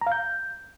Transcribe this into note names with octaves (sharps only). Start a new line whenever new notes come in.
A#5
F5
G6